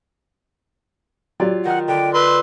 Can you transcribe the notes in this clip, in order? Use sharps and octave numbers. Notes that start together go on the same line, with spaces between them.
F#3 F4 G4 D5
D#3 F#5 F6
D3 G5
B4 C6 E6